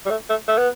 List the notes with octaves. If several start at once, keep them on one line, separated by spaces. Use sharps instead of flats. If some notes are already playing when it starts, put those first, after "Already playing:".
G3
A3
A3
A3
B3